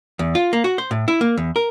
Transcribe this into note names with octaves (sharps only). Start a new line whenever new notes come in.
E2
F4
A#3
F#4
C5
A2
E4
A#3
E2
A#4